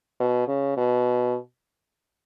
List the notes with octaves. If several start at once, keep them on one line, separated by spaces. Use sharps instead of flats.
B2
C#3
B2